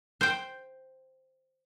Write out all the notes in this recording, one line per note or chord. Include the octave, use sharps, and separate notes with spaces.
C5 G5